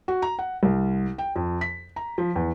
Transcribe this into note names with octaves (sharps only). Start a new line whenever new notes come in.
F#4
A#5
F#5
C2
G5
F2
B6
A#5
F3
E2